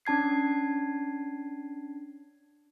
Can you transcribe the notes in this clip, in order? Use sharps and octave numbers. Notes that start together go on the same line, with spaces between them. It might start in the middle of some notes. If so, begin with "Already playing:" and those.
C#4 D4 A5 G#6 C7